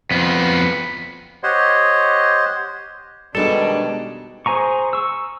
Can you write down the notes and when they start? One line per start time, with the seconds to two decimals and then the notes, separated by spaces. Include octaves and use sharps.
0.11 F2 B3
1.43 G4 C5 C#5 D#5 F#5 C6
3.35 B2 D#3 G3 G#3 D4 D#4 G#4 A4
4.46 G#4 C5 G#5 A#5 C#6
4.93 C#6 E6